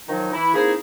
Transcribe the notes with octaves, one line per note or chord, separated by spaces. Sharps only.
D#3 F3 F#3 D#4
E3 E4
A#3 C4 D#4 E4 G#4